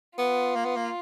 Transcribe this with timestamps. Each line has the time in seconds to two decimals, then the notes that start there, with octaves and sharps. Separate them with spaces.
0.18 B3 F4
0.56 A#3
0.66 B3
0.77 A#3